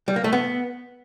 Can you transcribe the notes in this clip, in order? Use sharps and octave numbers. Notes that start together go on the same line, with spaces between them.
G3
A#3
A3
B3